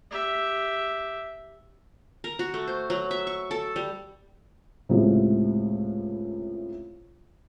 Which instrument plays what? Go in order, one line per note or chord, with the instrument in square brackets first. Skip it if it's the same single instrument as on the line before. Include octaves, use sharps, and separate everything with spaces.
[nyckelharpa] G4 E5
[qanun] A#4
F#4
A3
C5
F#3
E5
C#6
A4
G3
[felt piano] C#2 A2 C3